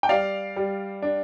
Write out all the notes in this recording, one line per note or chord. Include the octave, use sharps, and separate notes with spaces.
G5
G3 D5 F5
G3
D4